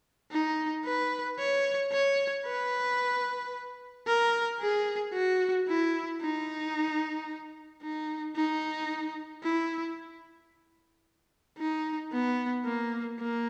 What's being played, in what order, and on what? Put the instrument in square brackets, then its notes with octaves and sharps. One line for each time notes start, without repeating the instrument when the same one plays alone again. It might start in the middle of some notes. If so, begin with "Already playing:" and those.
[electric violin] D#4
B4
C#5
C#5
B4
A#4
G#4
F#4
E4
D#4
D#4
D#4
E4
D#4
B3
A#3
A#3